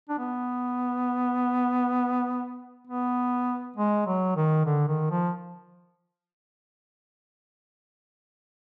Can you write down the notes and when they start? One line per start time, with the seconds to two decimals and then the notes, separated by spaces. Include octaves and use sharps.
0.09 D4
0.18 B3
2.88 B3
3.76 G#3
4.07 F#3
4.36 D#3
4.66 D3
4.88 D#3
5.11 F3